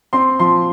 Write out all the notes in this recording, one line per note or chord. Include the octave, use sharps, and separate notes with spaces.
C4 C6
F3 C6